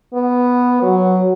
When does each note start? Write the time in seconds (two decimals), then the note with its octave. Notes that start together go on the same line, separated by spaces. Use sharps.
0.14 B3
0.82 F#3